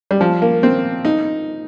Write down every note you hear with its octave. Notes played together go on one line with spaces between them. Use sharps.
G3
F3
A#3
C4
D#4